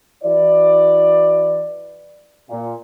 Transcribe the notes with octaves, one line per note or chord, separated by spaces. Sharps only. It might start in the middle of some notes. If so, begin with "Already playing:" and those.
E3 E4 F#4 B4 D5
A#2